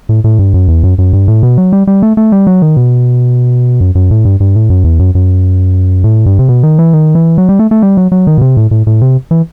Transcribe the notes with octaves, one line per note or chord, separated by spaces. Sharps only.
A2
A2
G2
F#2
E2
F#2
F#2
G2
A2
B2
F#3
G3
G3
A3
A3
G3
F#3
D#3
B2
F#2
F#2
A2
G2
G2
A2
F#2
E2
F#2
F#2
A2
G2
C3
B2
D#3
E3
D#3
E3
F#3
G3
A3
A3
G3
F#3
F#3
D#3
B2
C3
A2
A2
A2
C3
E3